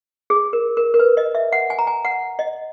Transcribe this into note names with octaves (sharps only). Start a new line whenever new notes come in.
G#4
A#4
A#4
A#4
B4
D#5
E5
F#5
G#5
A#5
G#5
F#5
D#5